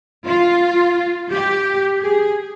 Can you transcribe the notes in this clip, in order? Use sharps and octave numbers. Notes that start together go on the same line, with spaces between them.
F4
G4
G#4